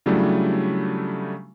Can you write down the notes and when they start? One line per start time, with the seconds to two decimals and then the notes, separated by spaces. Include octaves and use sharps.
0.06 C#3 F#3 G3 A3 D4 E4